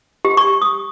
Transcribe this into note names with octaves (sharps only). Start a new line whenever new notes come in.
G4
C#6
D#6